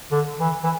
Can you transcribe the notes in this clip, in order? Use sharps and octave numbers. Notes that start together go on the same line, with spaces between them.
D3
E3
E3